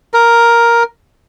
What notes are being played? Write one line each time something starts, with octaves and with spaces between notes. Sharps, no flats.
A#4